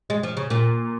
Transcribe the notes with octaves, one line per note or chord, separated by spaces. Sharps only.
G#3
F3
C#3
A#2